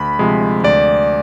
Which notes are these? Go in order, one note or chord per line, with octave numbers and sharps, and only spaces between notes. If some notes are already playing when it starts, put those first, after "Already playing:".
Already playing: D2 B5
C3 F3 G#3
D2 D5